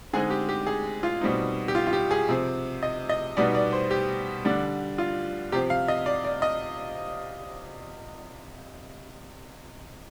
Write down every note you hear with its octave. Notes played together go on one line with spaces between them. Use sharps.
D3 G#3 C4 D#4 G#4
G4
G4
G#4
F4
B2 G3 C4 D#4
G4
F4
F4
G4
G#4
C3 F3 C4
D#5
D#5
B2 G3 B3 D#4 D5
D5
C5
G4
D3 G3 D4
F4
C3 F3 C4 G4
F5
D#5
D5
D5
D#5